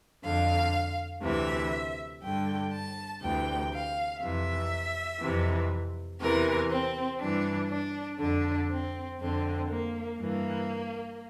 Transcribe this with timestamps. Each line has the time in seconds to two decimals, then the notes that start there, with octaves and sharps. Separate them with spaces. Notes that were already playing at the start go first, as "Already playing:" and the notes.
0.23 F2 D3 F5
1.22 D2 C3 E3 E5
2.22 G2 D3 G5
2.72 A5
3.21 D2 C3 E3 G5
3.72 F5
4.21 F2 C3 E3 E5
5.21 F2 C3 E3
6.20 E2 C3 E3 A#4
6.70 C4
7.20 G2 E3 D4
7.69 D4
8.19 F2 D3 D4
8.70 C4
9.19 F2 D3 C4
9.68 A#3
10.18 G2 E3 A#3